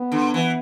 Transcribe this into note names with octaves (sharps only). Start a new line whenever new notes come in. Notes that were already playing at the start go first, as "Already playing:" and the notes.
Already playing: B3
D3
E3